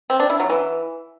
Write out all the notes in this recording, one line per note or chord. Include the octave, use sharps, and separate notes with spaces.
C4
D4
E4
F#3
E3